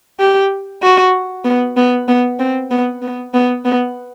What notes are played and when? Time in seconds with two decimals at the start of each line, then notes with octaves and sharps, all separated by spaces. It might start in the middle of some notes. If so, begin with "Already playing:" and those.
0.20 G4
0.83 F#4
1.45 B3
1.77 B3
2.08 B3
2.39 C4
2.71 B3
3.02 B3
3.34 B3
3.65 B3